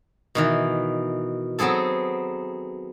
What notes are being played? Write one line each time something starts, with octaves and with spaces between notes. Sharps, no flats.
B2 D#3 E3
F#3 B3 C4 G#4 A4